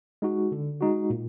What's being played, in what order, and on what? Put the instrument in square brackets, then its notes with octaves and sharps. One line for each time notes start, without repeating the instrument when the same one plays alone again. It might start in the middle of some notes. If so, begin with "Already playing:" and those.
[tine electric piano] G#3 D#4 F#4
D3
G#3 D#4 F#4
A#2